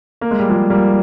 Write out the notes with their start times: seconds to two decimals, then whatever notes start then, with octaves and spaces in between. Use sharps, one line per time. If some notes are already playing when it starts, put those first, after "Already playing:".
0.21 A#3
0.31 G#3
0.40 G3
0.49 F3 G#3
0.70 G3 A#3